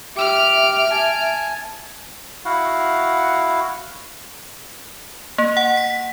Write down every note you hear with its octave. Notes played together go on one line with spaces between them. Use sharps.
G4 E5 F6 D7
G#5 A5
E4 F#4 F5 F#5
A#3
F#5
B6